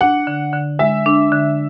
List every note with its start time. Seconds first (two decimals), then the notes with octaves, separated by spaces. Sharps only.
0.01 D4 F#5
0.27 D3
0.53 D3
0.79 G#3 E5
1.06 D4
1.32 D3